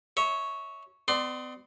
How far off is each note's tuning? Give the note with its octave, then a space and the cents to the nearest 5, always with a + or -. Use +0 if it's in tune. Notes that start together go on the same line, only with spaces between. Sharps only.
C#5 +0 E5 -30
B3 +45 D5 +30 C6 +0